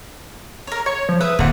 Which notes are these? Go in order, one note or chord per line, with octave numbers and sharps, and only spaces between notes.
A#4 C#5
C#5 C#6
F3
B4 E5 D#6
D1 A3 A#3 C4 F#5